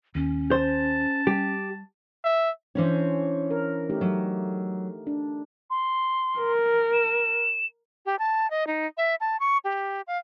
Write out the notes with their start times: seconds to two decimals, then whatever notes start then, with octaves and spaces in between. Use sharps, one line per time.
0.15 D#2 C#4
0.51 C5 A5
1.27 G3 G4
2.25 E5
2.75 E3 C#4 D4 C5 C#5
3.51 A#4
3.90 A3 D#4 G4
4.01 F#3
5.07 D4
5.70 C6
6.38 A#4
6.93 E7
8.06 G4
8.19 A5
8.50 D#5
8.67 D#4
8.97 E5
9.21 A5
9.40 C#6
9.64 G4
10.07 F5